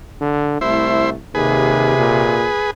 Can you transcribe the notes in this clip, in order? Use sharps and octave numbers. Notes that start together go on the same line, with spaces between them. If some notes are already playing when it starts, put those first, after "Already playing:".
D3
C2 A3 E4 C5
D#2 C3 G#4 B4
A#2